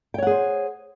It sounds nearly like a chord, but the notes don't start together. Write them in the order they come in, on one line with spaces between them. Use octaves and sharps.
G5 C#5 F#5 G#4 C5